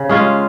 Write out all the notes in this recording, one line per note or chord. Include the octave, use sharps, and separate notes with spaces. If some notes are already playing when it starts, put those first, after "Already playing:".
Already playing: C#3
G#3 C#4 F4